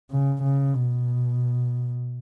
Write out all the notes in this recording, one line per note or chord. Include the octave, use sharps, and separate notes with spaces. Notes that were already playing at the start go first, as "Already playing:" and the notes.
C#3
C#3
B2